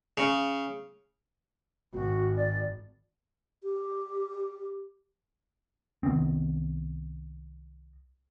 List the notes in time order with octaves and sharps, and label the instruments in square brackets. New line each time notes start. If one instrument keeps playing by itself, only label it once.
[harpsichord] C#3
[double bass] G#1 [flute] F#4
[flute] D5
[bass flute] G4
[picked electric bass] C2 D#3 B3 C4